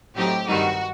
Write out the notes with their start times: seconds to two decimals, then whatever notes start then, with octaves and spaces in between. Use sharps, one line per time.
0.16 A2 F#3 A3 C4 D#4 G4
0.47 G2 D#3 G3 C4 D#4 F#4